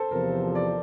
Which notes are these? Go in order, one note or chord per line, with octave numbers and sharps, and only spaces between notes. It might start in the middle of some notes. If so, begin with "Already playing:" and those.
Already playing: A4 C5
E2 C3 F3 A#4
D5